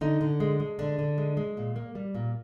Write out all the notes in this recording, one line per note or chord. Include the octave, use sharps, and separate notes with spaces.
D3 D#4
D3
G#3
G#3
D3 D4
D3
G#3
G#3
A#2
A#3
G3
A#2